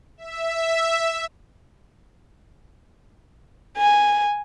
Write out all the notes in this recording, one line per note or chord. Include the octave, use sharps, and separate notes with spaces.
E5
G#5